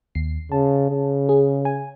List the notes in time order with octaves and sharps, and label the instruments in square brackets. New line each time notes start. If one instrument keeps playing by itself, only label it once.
[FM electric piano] D#2 C7
[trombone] C#3 [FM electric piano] A5
[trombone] C#3
[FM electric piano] G#4
G#5